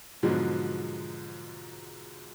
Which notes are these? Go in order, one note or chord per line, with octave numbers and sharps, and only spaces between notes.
G#2 B2 D3 F3 F#3 G#3